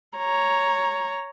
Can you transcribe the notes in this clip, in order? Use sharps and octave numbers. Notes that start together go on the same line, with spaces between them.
C#5 A#5